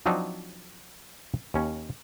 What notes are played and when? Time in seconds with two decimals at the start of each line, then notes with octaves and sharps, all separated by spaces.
0.06 F3 F#3 C4 D4 D#4
1.54 D#2 C#4